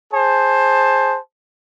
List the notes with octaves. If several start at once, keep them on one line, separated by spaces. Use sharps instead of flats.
G#4 C5 A5